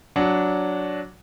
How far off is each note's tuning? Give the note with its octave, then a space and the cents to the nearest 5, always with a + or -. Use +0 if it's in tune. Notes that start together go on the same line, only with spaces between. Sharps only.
F#3 +0 D4 -10 F#5 +0